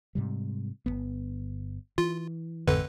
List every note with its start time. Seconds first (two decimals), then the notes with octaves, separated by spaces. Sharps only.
0.15 G#2 C3 G3
0.86 G1 E2 B3
1.98 E3 F4
2.68 A1 F2 G#2 D3 B4